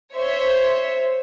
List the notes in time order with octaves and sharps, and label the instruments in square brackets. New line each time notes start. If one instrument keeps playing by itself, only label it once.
[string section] C5 C#5 E5